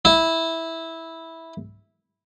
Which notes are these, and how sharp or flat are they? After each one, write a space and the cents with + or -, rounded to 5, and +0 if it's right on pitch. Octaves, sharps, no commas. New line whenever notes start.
E4 -10